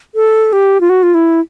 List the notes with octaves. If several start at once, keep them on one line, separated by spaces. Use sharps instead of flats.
A4
G4
F4
F#4
F4
E4